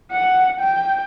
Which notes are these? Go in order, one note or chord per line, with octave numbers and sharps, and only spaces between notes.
F#5
G5